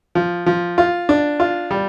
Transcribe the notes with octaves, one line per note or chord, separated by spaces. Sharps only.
F3
F3
F4
D4
F4
G3